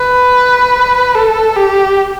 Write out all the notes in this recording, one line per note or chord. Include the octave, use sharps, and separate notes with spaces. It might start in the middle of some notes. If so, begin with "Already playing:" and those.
Already playing: B4
A4
G4